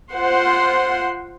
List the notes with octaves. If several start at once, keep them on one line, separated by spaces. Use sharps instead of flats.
F4 C5 F#5 C6